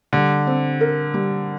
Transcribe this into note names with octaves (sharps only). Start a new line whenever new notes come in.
D3 G3
C4
A#4
G3